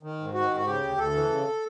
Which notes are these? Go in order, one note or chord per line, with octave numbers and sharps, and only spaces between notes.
D#3
G#2
D#3 F#4
G#2
F#4
C#3 G4
D2
D2 A4
E3
C#3